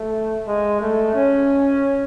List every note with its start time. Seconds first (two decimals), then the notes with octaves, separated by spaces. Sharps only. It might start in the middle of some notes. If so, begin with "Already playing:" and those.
Already playing: A3
0.47 G#3
0.81 A3
1.15 C#4